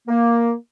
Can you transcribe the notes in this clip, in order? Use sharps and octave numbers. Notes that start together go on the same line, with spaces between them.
A#3